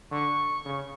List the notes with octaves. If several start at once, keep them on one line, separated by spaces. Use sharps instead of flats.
D3 C#6
C#3